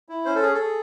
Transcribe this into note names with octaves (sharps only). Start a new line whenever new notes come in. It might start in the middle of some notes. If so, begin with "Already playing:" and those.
E4
C#4 C5
A4
G#4
A4
G#4